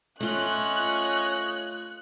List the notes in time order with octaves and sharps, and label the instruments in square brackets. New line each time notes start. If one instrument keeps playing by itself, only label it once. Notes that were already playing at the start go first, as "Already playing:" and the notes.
[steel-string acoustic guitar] A3 F4 [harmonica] C#4 C#5 D#5 [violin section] F#6